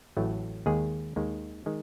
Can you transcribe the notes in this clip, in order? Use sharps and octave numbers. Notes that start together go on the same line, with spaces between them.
A1 A2 F#3 A3
D#2 D#3 G#3 G#4
D#2 D#3 G#3
D#3 G#3